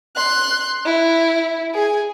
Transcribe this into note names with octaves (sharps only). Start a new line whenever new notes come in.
C6 F#6
E4
G#4 G#5